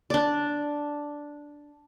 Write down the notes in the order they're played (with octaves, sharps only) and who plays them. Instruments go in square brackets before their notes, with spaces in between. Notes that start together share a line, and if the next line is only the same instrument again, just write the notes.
[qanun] D4 D5